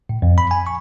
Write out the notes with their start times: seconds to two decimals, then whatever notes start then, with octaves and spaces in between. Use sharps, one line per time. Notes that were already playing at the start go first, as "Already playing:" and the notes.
0.09 A2
0.22 F2
0.38 B5
0.51 G#5
0.67 C#6